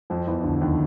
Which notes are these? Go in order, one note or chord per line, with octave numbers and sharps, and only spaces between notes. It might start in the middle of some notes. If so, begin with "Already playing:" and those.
F2 F3
E2 E3
D2 D3
D#2 D#3